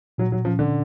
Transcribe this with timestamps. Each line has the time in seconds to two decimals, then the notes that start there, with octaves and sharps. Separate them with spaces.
0.18 A#2 F#3
0.32 F#3
0.45 F3 C#4
0.59 D3